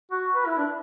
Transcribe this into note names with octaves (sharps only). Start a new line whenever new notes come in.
F#4
B4
E4
D4